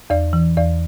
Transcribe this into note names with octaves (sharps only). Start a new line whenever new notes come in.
E2 D5
E3
E2 D5